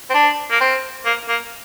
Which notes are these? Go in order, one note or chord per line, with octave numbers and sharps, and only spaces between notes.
C4
D4
A#3
C4
A#3
A#3